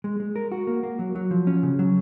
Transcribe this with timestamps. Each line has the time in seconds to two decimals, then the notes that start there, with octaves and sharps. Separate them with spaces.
0.04 G#3
0.20 G#3
0.36 A#4
0.52 F#4
0.67 A#3
0.83 A#3
0.99 F#3
1.16 F#3
1.31 F3
1.47 C#4
1.63 C#3
1.79 F#3